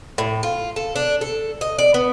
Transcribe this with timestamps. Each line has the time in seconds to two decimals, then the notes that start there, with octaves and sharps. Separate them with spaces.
0.18 A2
0.43 F4
0.76 A4
0.96 D4
1.21 A4
1.61 D#5
1.78 D5
1.94 B3